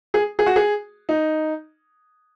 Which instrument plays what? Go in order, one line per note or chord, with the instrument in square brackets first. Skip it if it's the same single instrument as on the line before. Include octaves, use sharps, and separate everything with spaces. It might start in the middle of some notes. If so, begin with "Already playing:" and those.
[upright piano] G#4
G#4
F#4
G#4
D#4